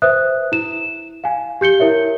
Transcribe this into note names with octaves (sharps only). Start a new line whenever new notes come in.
B4 C5 E5 D#6 F#6
E4 E7
F5 G#5
G4 G6 C#7 G7
E4 A#4 C#5 E5